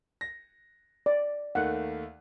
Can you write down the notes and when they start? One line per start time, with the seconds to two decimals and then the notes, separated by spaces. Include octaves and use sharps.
0.21 A#6
1.06 D5
1.55 D#2 D#3 A3 F#5